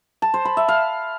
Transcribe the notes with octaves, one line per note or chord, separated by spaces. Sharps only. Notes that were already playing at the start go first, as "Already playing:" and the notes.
A5
C5
B5
E5
F5